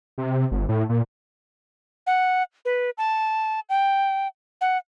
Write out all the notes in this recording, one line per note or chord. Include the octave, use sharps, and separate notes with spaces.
C3
G1
A2
A#2
F#5
B4
A5
G5
F#5